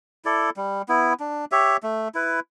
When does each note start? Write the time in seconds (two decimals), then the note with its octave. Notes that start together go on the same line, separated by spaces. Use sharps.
0.25 E4 A4 D5
0.57 G3
0.89 B3 E4
1.20 D4
1.51 G4 C#5 E5
1.83 A3
2.15 E4 B4